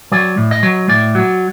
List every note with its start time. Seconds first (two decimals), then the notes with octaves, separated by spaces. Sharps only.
0.12 F#3 D5
0.37 A2
0.51 D#5
0.63 F#3
0.89 A2 D5
1.15 F#3